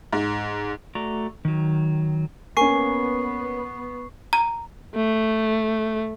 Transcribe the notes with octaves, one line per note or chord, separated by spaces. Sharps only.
G#2
A3 F#4 D5 A#5
D#3 F#3
A#3 B3 C#4 G#5 C#6 C7
A#5
A3